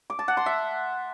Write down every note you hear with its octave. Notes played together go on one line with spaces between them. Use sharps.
D6
A5
F#5
C6
E5